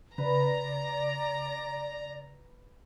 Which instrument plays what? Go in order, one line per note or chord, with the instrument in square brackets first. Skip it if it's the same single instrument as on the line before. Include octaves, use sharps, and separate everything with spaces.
[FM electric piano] C#3 [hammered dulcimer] B4 [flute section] D5 [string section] A#5